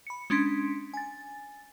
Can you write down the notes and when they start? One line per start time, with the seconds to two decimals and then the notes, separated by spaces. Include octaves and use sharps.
0.07 B5 C#7
0.30 G#3 C#4 D4 C6 G#6 B6
0.94 G#5 A6